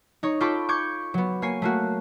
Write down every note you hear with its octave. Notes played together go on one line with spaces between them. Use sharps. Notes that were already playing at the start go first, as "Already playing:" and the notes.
D#4 C#5
F4 A4 G5 B5 C#6 D6
C#6 D6 G6 G#6 C#7
F#3 B3
A#3 C#5 G#5 C7
A3 A#3 F#4